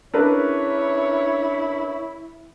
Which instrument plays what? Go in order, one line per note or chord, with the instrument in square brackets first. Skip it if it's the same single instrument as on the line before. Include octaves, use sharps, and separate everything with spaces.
[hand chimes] C#4 G#4 E6 [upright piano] D4 A#4 B4 [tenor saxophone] E4 [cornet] C#5